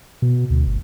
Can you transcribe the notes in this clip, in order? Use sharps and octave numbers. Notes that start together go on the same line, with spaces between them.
B2
D2
G1